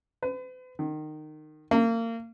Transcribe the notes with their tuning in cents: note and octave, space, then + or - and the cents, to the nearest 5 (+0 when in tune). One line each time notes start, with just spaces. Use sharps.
B4 +45
D#3 -20
A#3 -30